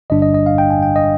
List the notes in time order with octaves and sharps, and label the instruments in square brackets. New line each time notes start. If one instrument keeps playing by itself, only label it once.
[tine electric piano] G1 G2 D3 G3 D4 D#5
D#5
D#5
F5
G5
G#5
G5
D#5